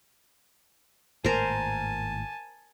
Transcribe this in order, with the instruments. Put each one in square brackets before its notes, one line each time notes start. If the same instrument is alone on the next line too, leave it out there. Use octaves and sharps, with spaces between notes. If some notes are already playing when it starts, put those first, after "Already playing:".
[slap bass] G#1 A2 A#3 [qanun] A#4 C5 [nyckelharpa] G#5 A5